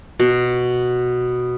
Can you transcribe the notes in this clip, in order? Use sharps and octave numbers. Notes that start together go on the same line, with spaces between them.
B2